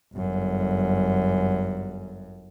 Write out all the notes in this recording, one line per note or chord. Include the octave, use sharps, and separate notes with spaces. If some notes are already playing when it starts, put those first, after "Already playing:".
G1 F#2